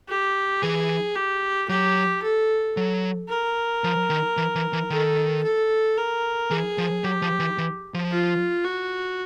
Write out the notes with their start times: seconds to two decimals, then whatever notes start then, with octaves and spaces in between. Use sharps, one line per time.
0.09 G4
0.62 E3 G#4
1.16 G4
1.69 F#3 G4
2.23 A4
2.77 F#3
3.30 A#4
3.84 F3
4.10 D#3
4.37 E3
4.55 E3
4.73 E3
4.90 D#3 A4
5.43 A4
5.98 A#4
6.50 E3 G#4
6.78 F3
7.04 F#3 G4
7.22 F3
7.40 E3
7.58 E3
7.94 F3
8.11 F4
8.64 F#4